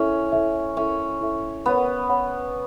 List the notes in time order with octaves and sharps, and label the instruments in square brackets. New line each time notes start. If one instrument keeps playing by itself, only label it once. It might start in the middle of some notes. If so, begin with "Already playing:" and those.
Already playing: [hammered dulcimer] C#4 [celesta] E4 A4 E5
[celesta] E4 A4 E5
[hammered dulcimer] C#4 [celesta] E4 A4 E5
[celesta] E4 A4 E5
[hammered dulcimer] B3 [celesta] C#5 F#5 B5
[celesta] C#5 F#5 B5